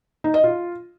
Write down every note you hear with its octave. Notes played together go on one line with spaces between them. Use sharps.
D#4
D#5
F4